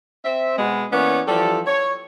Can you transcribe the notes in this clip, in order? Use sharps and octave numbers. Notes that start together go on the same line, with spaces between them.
C4 E5
B2 G#3 B3
E3 A#3 B3 C#4 C#5 D5
E3 F3 G3 G4 A4
C#5